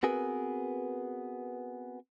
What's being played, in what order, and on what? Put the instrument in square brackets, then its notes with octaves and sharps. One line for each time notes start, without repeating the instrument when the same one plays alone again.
[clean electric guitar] B3 C4 F#4 G#4 A#4 B4